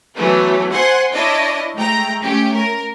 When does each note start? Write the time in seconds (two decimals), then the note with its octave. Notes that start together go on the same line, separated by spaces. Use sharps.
0.16 E3 F#3 A3 B3
0.72 C5 F#5 G#5 C6
1.12 D4 E4 C#5 D#5 A5
1.75 G#3 A3 G5 A#5
2.21 A3 C#4 G4
2.54 A#4